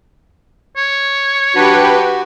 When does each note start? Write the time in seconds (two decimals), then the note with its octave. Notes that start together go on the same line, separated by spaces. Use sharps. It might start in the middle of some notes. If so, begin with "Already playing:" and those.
0.77 C#5
1.55 F#3 D4 F#4 G4 B4